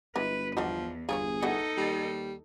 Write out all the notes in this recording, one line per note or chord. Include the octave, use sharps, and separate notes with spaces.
G1 E3 G#3 A#4 B4
E2 D3 F3 F#3 D#4
G1 F4 G#4 A#4 C#5
A3 B3 D#4 F#4 A4
D#2 G3